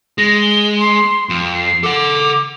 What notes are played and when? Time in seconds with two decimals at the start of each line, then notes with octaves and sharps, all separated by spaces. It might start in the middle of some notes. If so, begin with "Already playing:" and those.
0.18 G#3 A#6
0.41 G7
0.80 C6
1.29 F2
1.55 C7
1.83 A4 F#5 D6